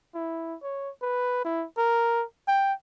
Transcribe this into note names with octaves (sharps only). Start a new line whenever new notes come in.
E4
C#5
B4
E4
A#4
G5